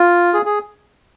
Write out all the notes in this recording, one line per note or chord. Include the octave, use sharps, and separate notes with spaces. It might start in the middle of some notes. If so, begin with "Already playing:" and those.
Already playing: F4
G#4
G#4